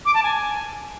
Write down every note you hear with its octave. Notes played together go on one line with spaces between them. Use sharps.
D6
A5
G#5